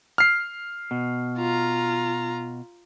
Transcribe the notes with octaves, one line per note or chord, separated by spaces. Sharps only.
F6 C7
B2
F4 A#5